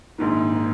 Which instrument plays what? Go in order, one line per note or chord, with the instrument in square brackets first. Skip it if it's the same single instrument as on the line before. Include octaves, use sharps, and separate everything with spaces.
[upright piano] A#1 G#2 D#3 [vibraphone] A#3